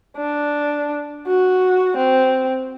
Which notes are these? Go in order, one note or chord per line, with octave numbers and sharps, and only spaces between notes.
D4
F#4
C4